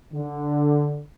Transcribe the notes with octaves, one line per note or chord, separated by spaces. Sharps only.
D3